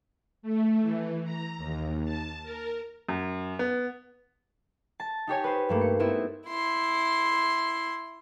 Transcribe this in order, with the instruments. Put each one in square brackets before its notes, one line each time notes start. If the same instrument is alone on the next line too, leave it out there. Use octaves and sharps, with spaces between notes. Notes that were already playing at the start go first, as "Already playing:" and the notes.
[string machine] A3
E3
A#5
D#2
A5
A#4
[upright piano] F#2
B3
[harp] A5
D#4 G4 C#5 G#5
B4 C5
G2 A3 A#3
C#7
A3 B3 C4 E4
[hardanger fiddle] E4 C6